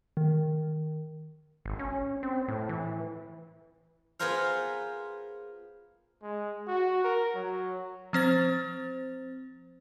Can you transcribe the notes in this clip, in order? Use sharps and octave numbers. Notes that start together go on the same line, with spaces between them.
D#3
G#1
C#4
C4
A2
E3
B3 F4 G#4 A#4 C5 F5
G#3
F#4
A#4
F#3
F3 C4 C5 A6